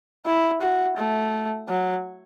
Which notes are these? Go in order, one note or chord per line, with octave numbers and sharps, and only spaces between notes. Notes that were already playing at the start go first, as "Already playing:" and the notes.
E4
F#4
A3
F#3